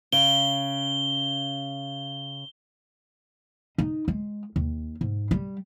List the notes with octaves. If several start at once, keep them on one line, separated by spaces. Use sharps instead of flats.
C#3 G7
D#4
G#3
D#2
G#2
G3